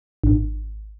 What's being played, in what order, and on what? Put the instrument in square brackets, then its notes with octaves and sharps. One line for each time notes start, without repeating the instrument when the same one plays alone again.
[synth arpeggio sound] G#1